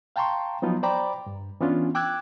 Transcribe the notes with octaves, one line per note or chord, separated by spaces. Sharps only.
F5 G5 A5 A#5 C6 C#6
F3 F#3 B3 D#4 F4
C5 D5 G5 A#5 B5 D6
G2
E3 B3 C#4 D4 F4
G5 D6 E6 F#6 G#6